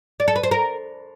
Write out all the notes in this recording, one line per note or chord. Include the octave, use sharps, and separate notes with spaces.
D5
A4
B4
C5
A#4